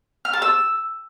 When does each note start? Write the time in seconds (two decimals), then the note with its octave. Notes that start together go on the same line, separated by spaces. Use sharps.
0.25 F6
0.33 A5
0.42 E6